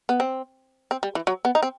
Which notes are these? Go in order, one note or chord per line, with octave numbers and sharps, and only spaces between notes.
B3
C4
C4
G3
E3
F#3
B3
D#4
C4